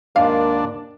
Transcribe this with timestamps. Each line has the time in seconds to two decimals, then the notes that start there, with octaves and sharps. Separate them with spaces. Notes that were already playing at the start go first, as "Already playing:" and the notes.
0.16 D#2 G#2 A#3 D4 F4 F5